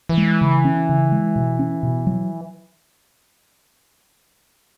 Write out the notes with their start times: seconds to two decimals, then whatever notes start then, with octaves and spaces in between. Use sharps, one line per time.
0.09 E3
0.17 G#3
0.41 C#3
0.65 C#4
0.89 C#3
1.12 G#3
1.36 B2
1.59 C#4
1.83 B2
2.07 F#3